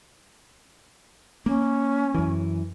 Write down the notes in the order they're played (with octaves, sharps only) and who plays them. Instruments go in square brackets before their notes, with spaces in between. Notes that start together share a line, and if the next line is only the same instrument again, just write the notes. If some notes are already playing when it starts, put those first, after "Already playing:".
[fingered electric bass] A#3 [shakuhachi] C#4
[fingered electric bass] F#2 E3